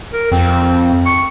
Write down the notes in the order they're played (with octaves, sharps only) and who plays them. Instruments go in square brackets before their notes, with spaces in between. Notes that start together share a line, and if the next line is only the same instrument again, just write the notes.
[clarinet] A#4
[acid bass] F2 [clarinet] C4
[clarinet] C#6